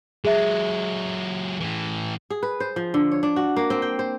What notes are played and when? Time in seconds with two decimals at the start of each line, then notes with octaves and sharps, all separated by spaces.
0.25 F#3 G#3 G#4 E5
1.60 A2 E3
2.30 G#4
2.43 B4
2.60 C5
2.76 F3
2.94 D3
3.12 C#5
3.23 D4
3.36 F#4
3.56 A#3
3.70 C4
3.82 G5
3.99 C5